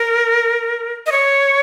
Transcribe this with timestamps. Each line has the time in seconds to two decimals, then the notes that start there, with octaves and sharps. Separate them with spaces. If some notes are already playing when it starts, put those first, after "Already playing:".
Already playing: A#4
1.06 D#5
1.12 C#5